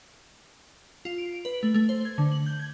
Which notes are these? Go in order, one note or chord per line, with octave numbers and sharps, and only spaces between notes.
F4
D7
D7
B4
A3
A3
C5
G#6
D3
F#7
G6
G#6